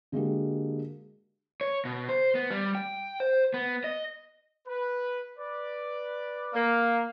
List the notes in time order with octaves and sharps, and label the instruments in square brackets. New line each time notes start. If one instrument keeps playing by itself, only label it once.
[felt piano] D3 G#3 A#3 F#4 G4
[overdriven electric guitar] C#5
B2
C5
B3
G3
G5
C5
B3
D#5
[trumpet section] B4
B4 D5
[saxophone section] A#3